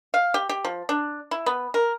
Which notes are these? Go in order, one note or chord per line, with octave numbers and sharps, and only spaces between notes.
F5
G4
G4
F3
D4
E4
B3
A#4